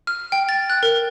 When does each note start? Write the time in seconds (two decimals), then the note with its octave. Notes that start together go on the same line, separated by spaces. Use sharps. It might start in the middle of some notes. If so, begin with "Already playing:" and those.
0.07 F6
0.32 G5
0.49 A6
0.70 F#6
0.83 A#4